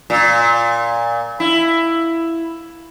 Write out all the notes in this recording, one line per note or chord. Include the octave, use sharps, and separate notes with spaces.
A#2
E4